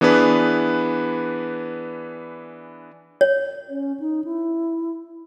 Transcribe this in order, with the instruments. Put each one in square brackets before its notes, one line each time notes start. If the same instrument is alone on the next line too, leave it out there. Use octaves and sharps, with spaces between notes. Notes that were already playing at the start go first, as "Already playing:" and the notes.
[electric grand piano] E3 B3 D4 G#4 B4
[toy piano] C#5
[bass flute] C#4
D#4
E4